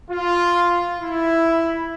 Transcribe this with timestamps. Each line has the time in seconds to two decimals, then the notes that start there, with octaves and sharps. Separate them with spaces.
0.11 F4
1.02 E4